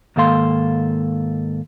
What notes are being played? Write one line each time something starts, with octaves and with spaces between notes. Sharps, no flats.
G#2 D#3 A#3 A4 F5 C6